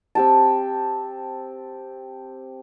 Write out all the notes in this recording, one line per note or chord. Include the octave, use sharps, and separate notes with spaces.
C4 G4 A5